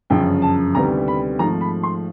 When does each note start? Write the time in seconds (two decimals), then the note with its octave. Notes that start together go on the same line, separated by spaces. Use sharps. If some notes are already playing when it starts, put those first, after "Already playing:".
0.10 G1 F#2 C#3 F3 G5
0.42 A5
0.74 D2 C3 D#3 G3 B3 A#5
1.08 B5
1.39 G#1 G#2 F3 A3 A#5
1.61 B5
1.83 C6